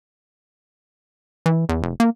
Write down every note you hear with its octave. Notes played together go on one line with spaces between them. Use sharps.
E3
E2
F1
A#3